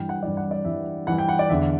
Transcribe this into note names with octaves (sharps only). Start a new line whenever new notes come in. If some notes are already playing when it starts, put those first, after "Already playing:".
Already playing: G2 E3 G5
F#5
G2 E3 D5
F#5
D5
G2 E3 E5
G2 E3 F#5
G5
F#5
D5
E2 D3 E5